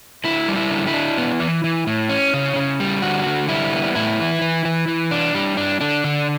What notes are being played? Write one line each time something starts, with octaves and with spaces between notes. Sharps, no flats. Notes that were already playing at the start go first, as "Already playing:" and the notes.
D3 E4
G3
E4
D3
E4
D4
B3
E3
E3
A2
C#4
C#3
C#3
G3
D3 F#4
D3
G3 E4
B3
A2 E4
E3
E3
E3
E3
D4
G3
D4
D3 D4
D3